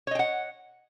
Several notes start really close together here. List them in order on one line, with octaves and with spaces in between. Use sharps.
C#5 D#5 G5 F#5